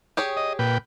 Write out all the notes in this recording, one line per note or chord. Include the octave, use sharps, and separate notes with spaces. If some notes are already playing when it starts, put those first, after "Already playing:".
G4 G#4 C#5
D#5
A#2 B4 G5